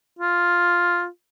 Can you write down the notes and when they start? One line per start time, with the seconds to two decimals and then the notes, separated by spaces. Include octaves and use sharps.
0.19 F4